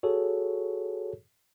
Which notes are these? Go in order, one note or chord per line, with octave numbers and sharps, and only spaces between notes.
F#4 G#4 A4 C#5